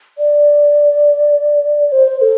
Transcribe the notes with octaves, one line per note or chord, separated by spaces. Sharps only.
D5
C5
A4